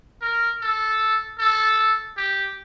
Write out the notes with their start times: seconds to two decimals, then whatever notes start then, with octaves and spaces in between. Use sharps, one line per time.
0.22 A#4
0.61 A4
1.38 A4
2.17 G4